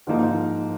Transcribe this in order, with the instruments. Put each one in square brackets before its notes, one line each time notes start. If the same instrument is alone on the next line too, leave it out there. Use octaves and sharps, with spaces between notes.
[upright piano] G#2 F3 A#3 D#4